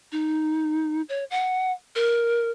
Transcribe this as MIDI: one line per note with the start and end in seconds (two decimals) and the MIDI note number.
0.12 1.02 63
1.09 1.24 73
1.30 1.72 78
1.95 2.51 70